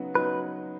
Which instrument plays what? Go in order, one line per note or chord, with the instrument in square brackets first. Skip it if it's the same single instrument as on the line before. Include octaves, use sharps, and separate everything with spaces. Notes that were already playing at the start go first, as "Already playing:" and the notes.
Already playing: [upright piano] C#3 F#3 B3 D#4 F#4
[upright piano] C#3 F#3 B3 D#4 F#4 [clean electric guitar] B4